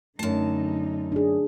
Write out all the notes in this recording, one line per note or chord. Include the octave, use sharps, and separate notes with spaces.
F#2 D3 A3 D#4 A5
D4 G#4